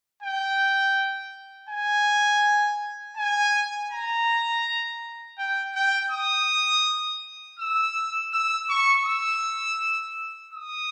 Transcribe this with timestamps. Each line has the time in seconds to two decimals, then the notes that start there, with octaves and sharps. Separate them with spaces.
0.23 G5
1.70 G#5
3.17 G#5
3.92 A#5
5.38 G5
5.76 G5
6.11 D#6
7.60 E6
8.33 E6
8.70 C#6
9.06 E6
10.54 D#6